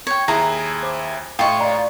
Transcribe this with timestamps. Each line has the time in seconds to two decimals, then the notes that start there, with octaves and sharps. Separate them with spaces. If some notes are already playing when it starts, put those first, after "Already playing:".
0.07 C#5 G5
0.28 D#2 E4 G#4 A#5
0.83 C5 D6
1.39 A2 F4 D#5 G5 C#6
1.59 D5 F5 A#5